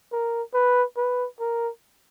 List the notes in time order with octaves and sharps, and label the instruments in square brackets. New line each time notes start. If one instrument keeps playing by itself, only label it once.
[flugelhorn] A#4
B4
B4
A#4